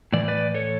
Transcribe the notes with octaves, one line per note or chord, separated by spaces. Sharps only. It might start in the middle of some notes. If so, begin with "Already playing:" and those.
A2 E3 D5
B4 D5
A4 C#5